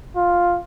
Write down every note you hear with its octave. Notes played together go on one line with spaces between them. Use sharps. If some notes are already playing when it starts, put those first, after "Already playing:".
F4